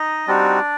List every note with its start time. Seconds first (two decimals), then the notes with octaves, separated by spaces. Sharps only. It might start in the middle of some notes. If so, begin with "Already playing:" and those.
Already playing: D#4 D#5
0.28 G3 C4 D4 D#4 F#4 D5